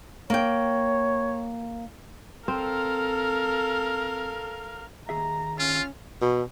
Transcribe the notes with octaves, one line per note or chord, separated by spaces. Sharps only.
A#3 C#5 G5
C4 A4 A#4 F5
D#2 G#4 E5 A#5
C#4 F4 F6
B2